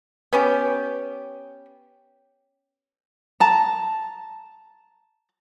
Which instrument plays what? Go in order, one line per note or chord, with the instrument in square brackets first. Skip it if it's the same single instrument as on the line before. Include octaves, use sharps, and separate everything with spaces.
[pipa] B3 C#4 G4
[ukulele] A5 A#5